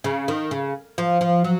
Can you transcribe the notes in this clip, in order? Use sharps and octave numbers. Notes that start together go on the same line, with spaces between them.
C#3
D#3
C#3
F3
F3
F#3